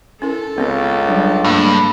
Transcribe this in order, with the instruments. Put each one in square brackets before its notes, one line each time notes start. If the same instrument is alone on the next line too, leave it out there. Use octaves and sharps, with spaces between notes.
[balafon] C#4 E4 A#4 [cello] A4
[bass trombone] C#2 [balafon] B3 C4
[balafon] F#3 G3 D4
[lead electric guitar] G2 [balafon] A3 A#3 D4